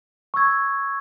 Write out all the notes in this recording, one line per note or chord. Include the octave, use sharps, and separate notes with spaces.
C#6 E6 G#6